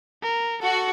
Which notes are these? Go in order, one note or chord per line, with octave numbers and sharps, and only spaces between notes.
A#4
F#4 A4